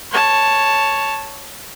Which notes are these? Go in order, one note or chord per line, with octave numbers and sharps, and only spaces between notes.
C#5 A5